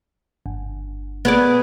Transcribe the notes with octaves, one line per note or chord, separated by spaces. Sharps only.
G1
B3 G#4 D5